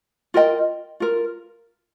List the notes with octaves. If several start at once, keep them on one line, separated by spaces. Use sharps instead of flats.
F4 A#4 D#5 G5
F4 A#4